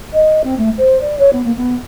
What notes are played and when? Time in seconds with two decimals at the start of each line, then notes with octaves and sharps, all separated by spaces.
0.13 D#5
0.44 C4
0.57 A3
0.77 C5
1.01 D5
1.18 C#5
1.32 B3
1.44 A#3
1.57 B3